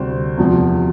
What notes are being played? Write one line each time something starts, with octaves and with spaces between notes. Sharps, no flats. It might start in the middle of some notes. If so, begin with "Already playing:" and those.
Already playing: D2 C3 G3 C4
E2 C3 F3